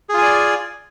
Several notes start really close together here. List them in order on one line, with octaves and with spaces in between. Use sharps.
G#4 F4 G#5 D5